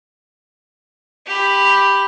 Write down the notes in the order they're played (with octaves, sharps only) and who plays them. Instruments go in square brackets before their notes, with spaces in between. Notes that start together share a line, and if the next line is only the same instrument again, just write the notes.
[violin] G4 B5